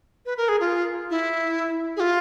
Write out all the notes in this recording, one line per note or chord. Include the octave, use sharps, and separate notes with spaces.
B4
A#4
G#4
F4
E4
G#4
F4